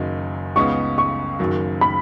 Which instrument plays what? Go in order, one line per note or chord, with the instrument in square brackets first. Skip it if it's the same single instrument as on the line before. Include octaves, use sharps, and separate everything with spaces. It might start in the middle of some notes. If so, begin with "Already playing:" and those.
Already playing: [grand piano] F#1 F#2 D#3 F#3 D#4
[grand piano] C#2 C#3 B3 D#4 [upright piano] C#6
[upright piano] C#6
[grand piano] F#1 F#2 D#3 F#3
[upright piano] B5